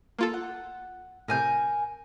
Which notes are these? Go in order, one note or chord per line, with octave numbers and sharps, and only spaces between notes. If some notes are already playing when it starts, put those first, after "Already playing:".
A#3 F4 A4
F#5
A2 C3 A#4 G#5 G6